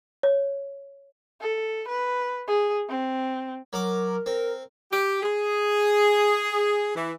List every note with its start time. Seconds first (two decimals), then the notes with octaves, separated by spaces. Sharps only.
0.23 C#5
1.41 A4
1.88 B4
2.47 G#4
2.89 C4
3.73 F#3 A#4 D6
4.26 C4 A#4
4.91 G4
5.22 G#4
6.95 E3